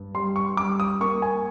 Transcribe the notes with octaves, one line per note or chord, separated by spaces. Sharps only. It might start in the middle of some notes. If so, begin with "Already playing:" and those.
Already playing: G2
G3 C6
C#6
G3 D6
D#6
A#3 C#6
G#5